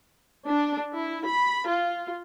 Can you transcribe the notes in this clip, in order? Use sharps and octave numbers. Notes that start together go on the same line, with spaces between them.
D4
E4
B5
F4